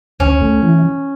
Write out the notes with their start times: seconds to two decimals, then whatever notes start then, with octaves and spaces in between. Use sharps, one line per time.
0.20 D2 C#4
0.41 A3
0.62 E3